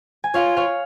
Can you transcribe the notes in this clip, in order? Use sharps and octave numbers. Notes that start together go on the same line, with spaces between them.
G#5
F4 C#5 F5
C#5 F5